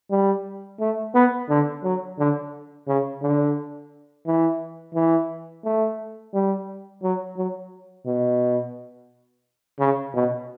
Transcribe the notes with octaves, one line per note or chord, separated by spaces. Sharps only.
G3
A3
B3
D3
F#3
D3
C#3
D3
E3
E3
A3
G3
F#3
F#3
B2
C#3
B2